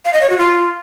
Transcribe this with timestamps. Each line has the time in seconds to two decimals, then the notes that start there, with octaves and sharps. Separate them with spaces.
0.05 F5
0.13 D#5
0.21 C#5
0.30 F#4
0.38 F4